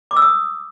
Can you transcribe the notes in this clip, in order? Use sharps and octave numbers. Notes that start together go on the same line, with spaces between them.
D6
E6
D#6